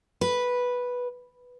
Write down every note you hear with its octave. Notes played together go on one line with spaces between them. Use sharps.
B4